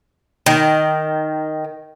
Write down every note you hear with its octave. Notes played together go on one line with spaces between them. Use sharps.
D#3